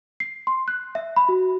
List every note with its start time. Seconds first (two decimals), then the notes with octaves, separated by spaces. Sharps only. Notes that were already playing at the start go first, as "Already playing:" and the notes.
0.20 C7
0.47 C6
0.68 F#6
0.95 E5
1.16 B5
1.29 F#4